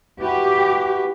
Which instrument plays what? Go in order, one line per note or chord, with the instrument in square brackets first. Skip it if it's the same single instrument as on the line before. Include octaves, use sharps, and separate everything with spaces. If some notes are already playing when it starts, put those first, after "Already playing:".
[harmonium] E4 F#4 B4 [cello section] G4